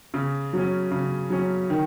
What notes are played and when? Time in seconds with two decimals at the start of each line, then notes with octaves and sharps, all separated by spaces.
0.14 C#3
0.53 F#3 C#4
0.91 C#3
1.30 F#3 C#4
1.70 D#3